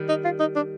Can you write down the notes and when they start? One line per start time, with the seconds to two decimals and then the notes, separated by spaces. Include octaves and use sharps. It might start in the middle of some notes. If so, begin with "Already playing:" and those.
Already playing: D#3 G3
0.09 D#4
0.24 F4
0.40 D#4
0.56 D4